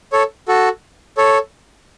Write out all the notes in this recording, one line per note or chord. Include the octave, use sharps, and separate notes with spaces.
A4 C#5
F#4 A4
A4 C#5